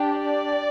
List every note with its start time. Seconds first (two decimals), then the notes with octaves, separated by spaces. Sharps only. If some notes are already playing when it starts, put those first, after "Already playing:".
Already playing: D4 G4
0.14 D5